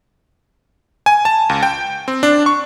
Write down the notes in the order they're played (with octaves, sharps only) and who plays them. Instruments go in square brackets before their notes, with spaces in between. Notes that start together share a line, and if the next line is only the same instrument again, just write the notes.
[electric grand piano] G#5
A5
C#2
G5
C4
D4
C#6